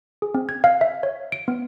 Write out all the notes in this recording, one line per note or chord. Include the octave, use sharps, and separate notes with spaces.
G#4
C4
G#6
F5
E5
C#5
D7
B3